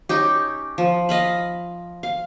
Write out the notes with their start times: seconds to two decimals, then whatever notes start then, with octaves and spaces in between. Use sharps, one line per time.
0.09 C#4 D#4 G4
0.78 F3
1.09 D#5 F5 B5
2.03 F5